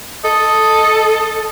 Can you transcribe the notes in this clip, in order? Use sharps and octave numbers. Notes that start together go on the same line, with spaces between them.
A4 D#5